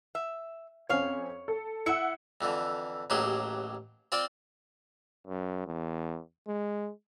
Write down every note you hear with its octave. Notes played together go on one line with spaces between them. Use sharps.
E5
F2 C4 C#4 C#5 F5
A4
E4 E5 F#5 C#7
F2 D3 E3
A1 D#2 F#3 G4 G#4 C5
C4 F4 C5 D5 G5
F#2
E2
G#3